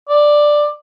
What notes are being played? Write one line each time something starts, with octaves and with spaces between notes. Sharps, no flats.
D5